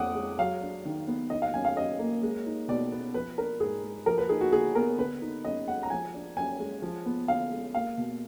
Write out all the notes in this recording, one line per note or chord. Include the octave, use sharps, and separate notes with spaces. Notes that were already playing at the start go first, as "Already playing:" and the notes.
Already playing: F2 F3 D4 F#5 D6 D#6
G#3
F#3 F5
D4
D#3
B3
D#3 D#5
F5
F#2 G#5
F5
F#2 D#5
A#3
G#3
D#4
B2 D5
B3
F3 B4
D4 A#4
G#2 G#4
G#3
F3 A#4
B4
D#4 G#4
F#4
D3 G#4
B3 A#4
D3 B4
D#4
F#2 D#5
G#3 F#5
A#5
F3 G#5
D4
F#2 G#5
G#3
F3
B3
D3 F5
G#3
A#3 F5
B2